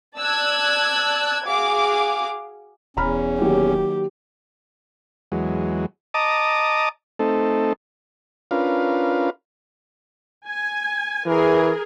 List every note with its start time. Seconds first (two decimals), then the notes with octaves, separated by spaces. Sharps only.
0.16 D5 A5 E6 F#6 G#6
1.46 F#4 G#4 F5 D6
2.97 E1 E2 C#4 A#5 B5 F6
3.39 D#3 F#3 A#3 G4
5.32 E2 F#3 G#3
6.14 D#5 A5 A#5 D6 D#6
7.19 A3 C4 D#4 A4
8.51 C#4 D4 F4 A#4 B4 F5
10.46 G#5
11.27 E3 G#4 A#4